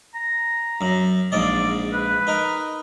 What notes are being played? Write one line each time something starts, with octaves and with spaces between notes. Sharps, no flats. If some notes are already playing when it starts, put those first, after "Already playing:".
A#5
F#2
A#1 G#2 D5 D#5
B4
D#4 A#4